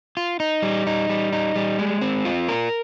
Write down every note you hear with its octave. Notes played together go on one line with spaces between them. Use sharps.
F4
D#4
G3
D#4
G3
D#4
G3
G#3
C4
F4
A#4